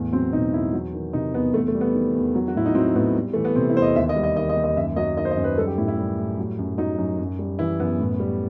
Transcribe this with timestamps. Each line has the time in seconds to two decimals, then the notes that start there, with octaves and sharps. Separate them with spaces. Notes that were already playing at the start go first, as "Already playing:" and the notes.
Already playing: E2 A2
0.12 F#3 C4
0.32 B2 D#4
0.54 E2 E4
0.73 F#3
0.94 D#3
1.13 C3 D#4
1.34 E2 B3
1.54 E2 A3
1.68 A3
1.74 G3
1.81 B3
1.94 D#3
2.15 E2
2.35 F#3
2.48 F#4
2.55 A2 E4
2.66 D#4
2.75 F#3 C4
2.95 A2 B3
3.16 G3
3.33 E3 A3
3.45 B3
3.56 C3 C4
3.70 E4
3.76 E2 C5
3.82 D#5
3.96 D#2 E5
4.09 D#5
4.16 G3
4.23 D#5
4.36 D#3 D#5
4.49 D#5
4.56 D#2
4.64 D#5
4.77 F#2 E5
4.96 F#3 D#5
5.17 D#3 D#5
5.25 C5
5.31 D#5
5.37 F#2
5.44 B4
5.58 G3 A4
5.67 G4
5.78 A2 E4
5.88 E4
5.97 G3
6.19 A2
6.39 F#3
6.59 F#2
6.78 F#3 D#4
6.98 F#2
7.19 F#2
7.39 G3
7.59 E3 E4
7.80 F#2 B3
8.00 A2
8.20 G3